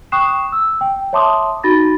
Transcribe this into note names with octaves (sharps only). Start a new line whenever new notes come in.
G5 C#6 D#6 F#6 C7 E7
E6
G5
C#5 E5 A5 C6 D6 D#6
D#4 F#4 B5 A6 A#6